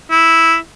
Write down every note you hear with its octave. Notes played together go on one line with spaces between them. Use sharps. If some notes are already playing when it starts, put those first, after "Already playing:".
E4